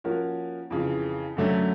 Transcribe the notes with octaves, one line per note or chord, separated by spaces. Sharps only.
F3 A#3 C#4 F#4 A#4
F2 C#3 E3
F#2 D3 F#3 A3 C#4